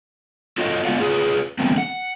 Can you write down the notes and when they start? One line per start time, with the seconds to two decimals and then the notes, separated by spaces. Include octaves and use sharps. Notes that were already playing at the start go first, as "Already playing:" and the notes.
0.58 F4 F#4 A4 C#5 D#5
0.85 G#3 B3 F4 D5 F5 F#5
0.99 F4 G#4 A#4 B4
1.59 D3 E3 G3 A3 B3 C4
1.78 F#5